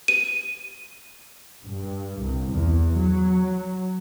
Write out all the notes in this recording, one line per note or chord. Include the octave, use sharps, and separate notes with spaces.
D#7
G2
C2
E2
F#3